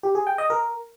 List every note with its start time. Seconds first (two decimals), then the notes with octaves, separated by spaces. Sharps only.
0.03 G4
0.15 G#4
0.27 G5
0.38 D#5
0.50 A#4